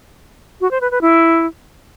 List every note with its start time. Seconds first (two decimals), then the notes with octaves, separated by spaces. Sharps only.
0.61 F#4
0.71 C5
0.81 B4
0.91 B4
1.01 E4